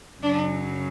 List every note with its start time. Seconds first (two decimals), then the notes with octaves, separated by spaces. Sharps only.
0.22 F#2 C#3 F#3 D4